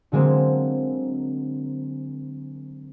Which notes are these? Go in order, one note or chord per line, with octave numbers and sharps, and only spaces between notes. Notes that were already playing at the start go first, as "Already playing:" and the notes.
D3 F#3 G#3 A#3 C4